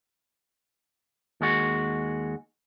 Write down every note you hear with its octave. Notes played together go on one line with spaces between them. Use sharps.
D#2 G#3 F#4